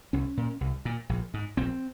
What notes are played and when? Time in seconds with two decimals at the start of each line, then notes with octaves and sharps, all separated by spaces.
0.13 C2 C#4
0.37 A#2
0.61 C2
0.85 A#2
1.09 A#1
1.34 G#2
1.57 A#1 C4